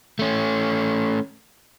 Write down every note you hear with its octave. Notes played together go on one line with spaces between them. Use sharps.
A3 C#4